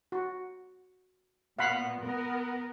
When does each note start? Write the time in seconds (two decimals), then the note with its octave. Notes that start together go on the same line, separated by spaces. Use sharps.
0.12 F#4
1.59 A#2 B3 F5 F#5 B5
2.03 B3 A#4